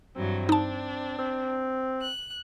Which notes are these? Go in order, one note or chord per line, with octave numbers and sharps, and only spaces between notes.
G2 E3 F#3 C4
D4 D#4 A5
C4
F#6